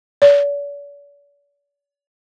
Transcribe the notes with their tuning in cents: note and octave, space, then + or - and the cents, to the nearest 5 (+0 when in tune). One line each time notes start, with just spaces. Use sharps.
D5 -45